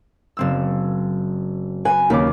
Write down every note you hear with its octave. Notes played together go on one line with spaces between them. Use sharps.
F#1 C4 E6
B4 G#5
D#2 C#3 A#3 D6